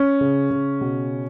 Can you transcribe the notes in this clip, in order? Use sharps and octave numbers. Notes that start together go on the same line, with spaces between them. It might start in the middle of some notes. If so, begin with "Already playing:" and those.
Already playing: C#4
C#3
C#3
B2